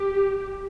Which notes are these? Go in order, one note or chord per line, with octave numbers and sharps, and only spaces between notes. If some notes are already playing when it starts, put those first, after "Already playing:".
Already playing: G4